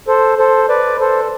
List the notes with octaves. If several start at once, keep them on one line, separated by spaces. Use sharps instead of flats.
A4 C5
A4 C5
B4 D5
A4 C5